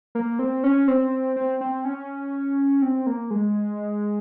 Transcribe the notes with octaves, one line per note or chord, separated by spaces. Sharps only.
A#3
C4
C#4
C4
C4
C4
C#4
C4
A#3
G#3